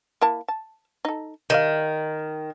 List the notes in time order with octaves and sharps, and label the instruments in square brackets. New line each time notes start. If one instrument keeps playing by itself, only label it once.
[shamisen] A#3 E4 A5
A5
D#4 A4
[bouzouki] D#3 [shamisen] G3 D#5 F5